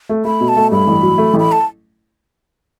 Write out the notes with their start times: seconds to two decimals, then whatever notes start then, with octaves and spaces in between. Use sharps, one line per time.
0.09 A3
0.25 A3 B5
0.41 B2
0.48 A5
0.56 A3
0.72 G2 B5
0.87 A1
1.02 F#3
1.18 A3
1.34 A1
1.39 B5
1.52 A5